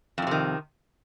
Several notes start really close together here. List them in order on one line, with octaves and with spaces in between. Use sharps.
F2 A2 C3 D#3